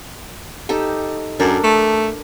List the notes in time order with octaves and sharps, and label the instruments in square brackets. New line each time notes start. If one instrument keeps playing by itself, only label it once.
[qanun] D#4 G4 A4
[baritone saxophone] F#2 [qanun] D4 A4 A#4
[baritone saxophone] A3